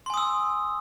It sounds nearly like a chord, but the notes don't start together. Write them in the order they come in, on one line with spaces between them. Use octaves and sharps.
C6 G#5 D#6 E6